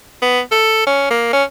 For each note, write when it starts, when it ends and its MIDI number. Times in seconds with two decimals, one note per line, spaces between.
0.22 0.40 59
0.51 0.84 69
0.87 1.11 61
1.11 1.33 58
1.33 1.43 61